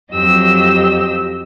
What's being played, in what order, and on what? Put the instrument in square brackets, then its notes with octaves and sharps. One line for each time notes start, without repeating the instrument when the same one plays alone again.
[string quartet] F2 F#3 G4 D#5 E6